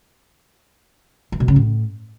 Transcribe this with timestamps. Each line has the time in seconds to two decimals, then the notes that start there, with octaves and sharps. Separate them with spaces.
1.32 E3
1.40 B2
1.48 C#3
1.56 A2